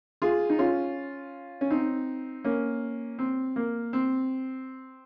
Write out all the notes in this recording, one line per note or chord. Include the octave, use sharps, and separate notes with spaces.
F4 G#4
D#4
C#4 F4
C#4
C4 D#4
A#3 C#4
C4
A#3
C4